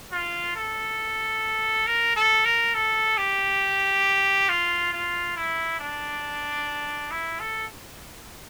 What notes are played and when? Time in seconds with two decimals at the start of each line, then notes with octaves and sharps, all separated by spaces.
0.12 F4
0.56 A4
1.87 A#4
2.16 A4
2.45 A#4
2.74 A4
3.17 G4
4.49 F4
4.93 F4
5.36 E4
5.80 D4
7.11 E4
7.40 A4